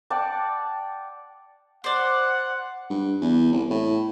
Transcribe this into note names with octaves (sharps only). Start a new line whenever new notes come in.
D5 F#5 G5 A5
C5 D5 F#5
G2
E2
C2
A2